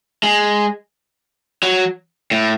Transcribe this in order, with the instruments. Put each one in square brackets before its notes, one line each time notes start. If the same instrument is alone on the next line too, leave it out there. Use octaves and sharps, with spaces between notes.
[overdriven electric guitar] G#3
F#3
A2